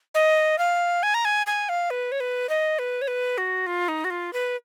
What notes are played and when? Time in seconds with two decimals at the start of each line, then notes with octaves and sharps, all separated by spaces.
0.15 D#5
0.58 F5
1.03 G#5
1.14 A#5
1.25 G#5
1.47 G#5
1.69 F5
1.90 B4
2.12 C#5
2.20 B4
2.49 D#5
2.79 B4
3.02 C#5
3.08 B4
3.38 F#4
3.67 F4
3.88 D#4
4.04 F#4
4.10 F4
4.33 B4